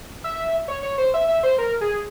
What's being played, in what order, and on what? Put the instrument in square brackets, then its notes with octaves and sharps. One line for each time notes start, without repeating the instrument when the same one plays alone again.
[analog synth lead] E5
C#5
C#5
C5
E5
E5
C5
A#4
G#4